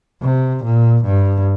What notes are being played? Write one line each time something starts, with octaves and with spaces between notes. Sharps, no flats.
C3
A#2
G2